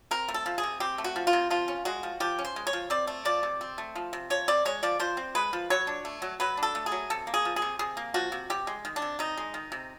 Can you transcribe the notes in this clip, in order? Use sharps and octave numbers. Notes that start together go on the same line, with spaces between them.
C4 A#4
A3
A4
F3
G#4
C3
C4 G4
A3
F#4
F3
F4
C3
F3 F4
C#4
G#3 F#4
F3
F3 G4
C#4
C5
G#3
C#5
F3
C4 D5
A3
F3 D5
C3
C4
A3
F3
C3
F3 C#5
C4 D5
G#3 C#5
F3 D5
F3 C5
C4
G#3 B4
F3
F#3 C#5
D4
A3
F#3
F#3 B4
D4
A4
A3
G#4
F#3
C3 A4
A#3
G#4
F3
G#4
C3
C3 G#4
A#3
F3 F#4
C3
C3 G4
G#3
D#3
D4
C3
C3 D#4
G#3
D#3
C3